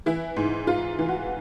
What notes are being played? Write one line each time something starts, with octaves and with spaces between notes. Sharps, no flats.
E3 E4
G#2
G#2 F4
E3
F#4